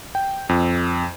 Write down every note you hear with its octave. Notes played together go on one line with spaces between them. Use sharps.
G5
F2